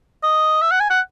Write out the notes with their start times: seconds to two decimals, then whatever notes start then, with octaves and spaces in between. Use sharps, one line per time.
0.23 D#5
0.62 E5
0.71 F#5
0.80 G#5
0.90 F#5